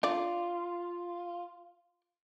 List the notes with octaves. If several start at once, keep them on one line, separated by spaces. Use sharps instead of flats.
D4 F4 D5